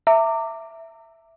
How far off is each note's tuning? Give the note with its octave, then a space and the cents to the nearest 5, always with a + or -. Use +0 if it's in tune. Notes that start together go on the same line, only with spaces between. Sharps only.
E5 +0 A#5 -35 D6 +0